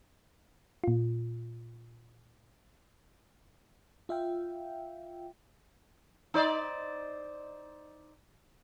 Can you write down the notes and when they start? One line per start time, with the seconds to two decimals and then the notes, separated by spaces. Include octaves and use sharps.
0.84 A#2 F4
4.09 F4 E5 F5 G5
6.34 D#4 C5 D5